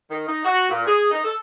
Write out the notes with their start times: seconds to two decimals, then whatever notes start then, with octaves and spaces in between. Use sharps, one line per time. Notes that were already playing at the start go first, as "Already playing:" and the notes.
0.10 D#3
0.28 D#4
0.45 F#4
0.70 A#2
0.87 G#4
1.11 D#4
1.24 A4